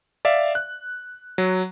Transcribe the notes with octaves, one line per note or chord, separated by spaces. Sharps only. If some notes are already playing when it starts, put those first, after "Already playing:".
D5 E5 F5
F#6
F#3